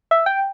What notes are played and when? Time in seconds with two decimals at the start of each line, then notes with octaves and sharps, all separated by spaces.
0.11 E5
0.26 G5